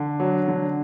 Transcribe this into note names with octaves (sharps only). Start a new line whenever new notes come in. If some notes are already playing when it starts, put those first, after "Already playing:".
Already playing: D3
F#3
D3